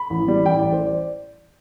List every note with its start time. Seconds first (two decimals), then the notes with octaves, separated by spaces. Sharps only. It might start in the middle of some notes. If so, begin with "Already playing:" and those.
Already playing: B5
0.10 A1
0.28 G3
0.45 A1 G5
0.59 A1 D5
0.72 C5
0.86 D5